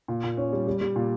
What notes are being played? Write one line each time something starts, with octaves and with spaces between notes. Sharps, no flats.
A#2
A#2
C#4
G3
G3
G3
A#2